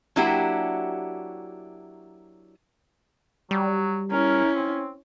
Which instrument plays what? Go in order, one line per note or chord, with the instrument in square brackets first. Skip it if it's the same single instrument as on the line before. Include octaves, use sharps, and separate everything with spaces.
[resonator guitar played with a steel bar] F#3 A#3 D4 E4 F#4 G4
[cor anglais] F#3 [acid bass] G3
[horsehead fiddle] C#4 E4 [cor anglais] A#4
[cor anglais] C4